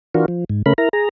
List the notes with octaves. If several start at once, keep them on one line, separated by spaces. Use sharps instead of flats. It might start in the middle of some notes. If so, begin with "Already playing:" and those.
E3 D4 F4 F#4 A#4
F3
G#2
C#3 A3 C#4 A#4 B5
E4 A#4 A#5
G#4 A#5